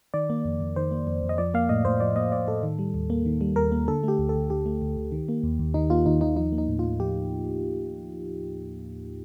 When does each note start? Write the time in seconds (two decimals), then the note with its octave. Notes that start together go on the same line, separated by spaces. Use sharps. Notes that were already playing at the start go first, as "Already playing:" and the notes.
0.14 D#3 D5
0.30 A#3
0.45 F2
0.60 F2
0.76 D#3 C5
0.91 A#3
1.07 F2
1.23 F2
1.29 D#5
1.38 F3 D5
1.54 A#3 F5
1.69 A2 D#5
1.85 A2 C5
2.00 F3 D5
2.16 A#3 D#5
2.32 A2 D5
2.47 A2 A4
2.63 D#3
2.79 G3
2.94 D#2
3.10 A#3
3.26 D#3
3.41 G3
3.56 D#2 A#4
3.72 A#3
3.88 D3 A4
4.03 A3 G4
4.19 D2
4.29 A4
4.35 D2
4.50 D3 G4
4.66 A3
4.82 D2
4.97 D2
5.12 D#3
5.28 A#3
5.44 D#2
5.60 D#2
5.74 D#3 D#4
5.90 A#3 F4
6.06 D#2 D#4
6.21 D#2 D#4
6.36 F3 D#4
6.52 A#3
6.58 D#4
6.68 A2
6.79 A2 F4
7.00 F3 G4